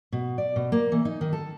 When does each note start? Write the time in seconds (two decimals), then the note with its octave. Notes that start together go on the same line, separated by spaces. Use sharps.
0.12 B2
0.38 D5
0.56 B2
0.72 A#3
0.92 E3
1.05 D#4
1.21 D#3
1.33 A4